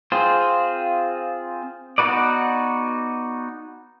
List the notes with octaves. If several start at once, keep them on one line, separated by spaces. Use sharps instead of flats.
C4 F4 G#4 C5
B3 D#4 F#4 B4 D5